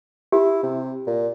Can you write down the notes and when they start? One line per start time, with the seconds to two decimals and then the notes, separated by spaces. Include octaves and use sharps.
0.32 E4 G4
0.63 C3
1.07 A#2